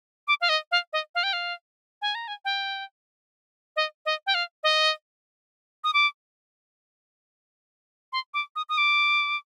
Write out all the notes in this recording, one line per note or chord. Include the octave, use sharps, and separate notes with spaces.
D6
F5
D#5
F5
D#5
F5
G5
F5
G#5
A#5
G#5
G5
D#5
D#5
G5
F5
D#5
D#6
D6
C6
D6
D#6
D#6
D6